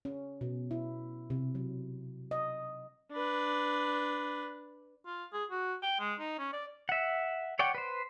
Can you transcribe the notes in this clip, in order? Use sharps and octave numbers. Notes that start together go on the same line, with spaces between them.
C#4
B2
E4
C3
F#3
D#5
D4 B4
F4
G#4
F#4
G5
G#3
D#4
C#4
D5
E5 F#5
C#5 D5 F#5 G5
B4 C5